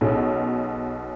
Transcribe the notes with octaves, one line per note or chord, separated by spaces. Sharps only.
B1 B2 C#4 G#4